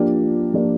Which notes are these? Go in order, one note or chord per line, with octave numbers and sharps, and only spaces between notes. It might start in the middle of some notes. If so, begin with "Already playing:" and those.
Already playing: F3 A#3 D4 G4 D5
F3 A#3 D4 G4 D5